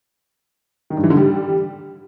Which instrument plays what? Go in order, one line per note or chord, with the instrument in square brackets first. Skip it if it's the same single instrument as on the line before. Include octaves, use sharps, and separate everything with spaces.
[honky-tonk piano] D#3
G2
E3
D3
G3